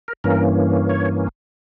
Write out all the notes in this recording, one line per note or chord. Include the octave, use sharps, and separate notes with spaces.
A#4
G2 E3 A#3 C#4 A#4
C#5